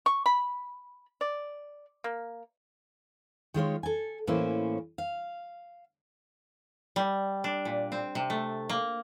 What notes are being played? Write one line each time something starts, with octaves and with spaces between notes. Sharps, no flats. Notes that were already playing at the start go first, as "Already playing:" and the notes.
C#6
B5
D5
A#3
D#3 G#3 F4 C#5
A4 G#5
A2 E3 A#3 C#4 C5 E5
F5
G3
D4
A#2
C4
C3
A3
A#3